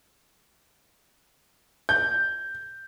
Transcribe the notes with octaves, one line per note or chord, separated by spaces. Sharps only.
G6